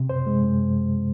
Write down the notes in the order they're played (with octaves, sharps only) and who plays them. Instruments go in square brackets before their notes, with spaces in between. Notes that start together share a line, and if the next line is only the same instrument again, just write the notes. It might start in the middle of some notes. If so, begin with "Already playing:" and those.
Already playing: [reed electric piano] C3
F#2 C5
G#3
F#2